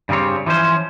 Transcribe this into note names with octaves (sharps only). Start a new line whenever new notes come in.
G2 C#3 G3 C4 C#5
E3 F3 C#4 C5